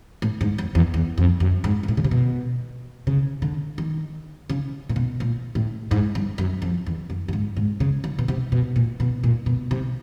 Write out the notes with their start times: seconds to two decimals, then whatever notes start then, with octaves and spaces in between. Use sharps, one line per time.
0.22 A2
0.41 G#2
0.58 E2
0.75 E2
0.94 E2
1.18 F2
1.40 F#2
1.64 G#2
1.83 G#2
1.88 A2
1.97 C#3
2.04 C3
2.11 B2
3.07 C#3
3.42 D3
3.78 D#3
4.50 C#3
4.89 A#2
4.96 B2
5.20 A#2
5.55 A2
5.91 G#2
6.15 G2
6.38 F#2
6.62 F2
6.87 E2
7.10 F#2
7.28 G2
7.33 G#2
7.57 G#2
7.80 C#3
8.04 D3
8.19 B2
8.28 C3
8.52 B2
8.76 A#2
9.00 B2
9.24 A#2
9.46 B2
9.71 C3